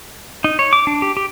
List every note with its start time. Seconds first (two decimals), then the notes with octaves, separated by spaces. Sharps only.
0.44 D#4
0.59 C#5
0.73 D6
0.87 D4
1.02 G4
1.17 G4